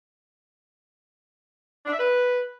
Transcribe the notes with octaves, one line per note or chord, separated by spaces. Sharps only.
D4
E5
B4